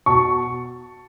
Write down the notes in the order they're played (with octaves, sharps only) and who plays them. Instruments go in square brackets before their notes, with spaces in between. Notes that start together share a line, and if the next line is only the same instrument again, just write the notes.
[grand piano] B2 A5 C#6